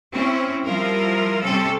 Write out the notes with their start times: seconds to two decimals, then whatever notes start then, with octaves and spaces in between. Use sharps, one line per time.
0.12 C4 C#4 E4
0.65 F3 G3 E4 F4 A#4
1.43 C3 G3 C4 C#4 A4